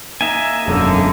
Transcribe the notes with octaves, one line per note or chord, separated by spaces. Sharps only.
A#3 D#4 E5 G#5
E1 F#2 D3